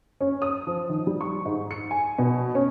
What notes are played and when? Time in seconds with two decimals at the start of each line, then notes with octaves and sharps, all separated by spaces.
0.21 C#4
0.42 D#6
0.67 F3
0.89 D#3
1.07 G3
1.21 C#6
1.45 G#2
1.71 C#7
1.91 G#5
2.19 B2
2.55 C#4